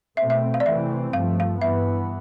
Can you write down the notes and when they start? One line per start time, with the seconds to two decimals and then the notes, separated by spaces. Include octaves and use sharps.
0.17 B2 A3 C4 E5
0.30 E5
0.54 F5
0.60 D5
0.65 C3 E3 A3 C4 E5
1.13 G2 F3 A3 F5
1.40 F5
1.62 G2 E3 B3 E5